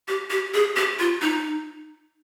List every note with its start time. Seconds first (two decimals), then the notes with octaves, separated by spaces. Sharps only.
0.08 G4
0.30 G4
0.54 G#4
0.76 G4
0.99 F4
1.22 D#4